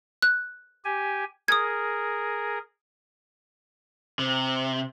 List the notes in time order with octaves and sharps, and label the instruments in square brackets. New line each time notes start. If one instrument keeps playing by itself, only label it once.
[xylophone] F#6
[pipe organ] G4 G#5
[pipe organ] G#4 A#4 [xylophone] D#6 G#6
[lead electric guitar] C3